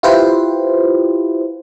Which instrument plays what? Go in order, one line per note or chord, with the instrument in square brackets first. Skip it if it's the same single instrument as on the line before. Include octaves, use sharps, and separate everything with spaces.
[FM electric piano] E4 F4 G4 B4 C5